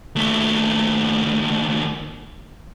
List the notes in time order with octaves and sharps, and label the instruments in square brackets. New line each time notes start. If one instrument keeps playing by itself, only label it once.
[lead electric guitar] D#2 A3